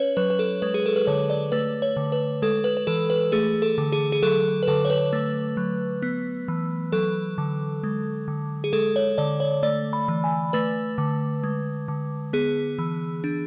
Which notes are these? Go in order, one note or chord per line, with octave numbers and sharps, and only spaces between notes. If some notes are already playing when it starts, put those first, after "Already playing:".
Already playing: C#4 B4 C#5
F#3 B4
B4
A4
G#3 B4
G#4
A4
B4
D3 C#5
D5
A3 B4
C#5
D3
B4
G#3 A4
B4
B4
E3 A4
B4
A3 G#4
A4
D3
G#4
G#4
F#3 A4
B4
D3 A4
C#5
B4
A3
F#3
B3
E3
F#3 A4
D3
G#3
D3
G#4
G#3 A4
C#5
D3 D5
C#5
A3 D5
B5
E3
G#5
A3 B4
D3
G#3
D3
B3 G#4
E3
D4